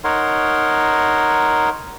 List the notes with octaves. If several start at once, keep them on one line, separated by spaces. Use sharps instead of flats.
D#4 A#4 C#5 F#5 C6